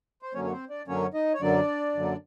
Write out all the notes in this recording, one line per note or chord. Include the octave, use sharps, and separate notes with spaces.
C5
F#2 D3 F#3 A#3 C#4 C#5
C#5
C4 C5
D4 D5
F#2 D3 F#3 A#3 C#4 C#5
D#4 D#5
C#5
F#2 D3 F#3 A#3 D4 D5
F#2 D3 F#3 A#3